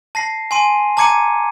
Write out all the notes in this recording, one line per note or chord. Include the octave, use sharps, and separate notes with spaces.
A5 A#6 C7
G#5 C6 D#7
A5 A#5 D6 G#6 C#7 D#7